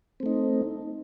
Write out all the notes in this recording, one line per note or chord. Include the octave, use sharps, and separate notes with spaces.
A3 C4 D#4